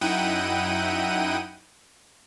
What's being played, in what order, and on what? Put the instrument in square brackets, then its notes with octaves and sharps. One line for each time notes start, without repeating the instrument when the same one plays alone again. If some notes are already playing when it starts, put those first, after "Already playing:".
[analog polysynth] F#2 D#4 E4 F#5 G5 D#7